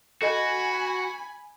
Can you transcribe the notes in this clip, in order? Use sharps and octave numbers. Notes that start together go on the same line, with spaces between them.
F#4 A4 D#5 G#5 B5